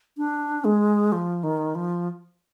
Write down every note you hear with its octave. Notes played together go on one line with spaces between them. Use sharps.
D4
G#3
F3
D#3
F3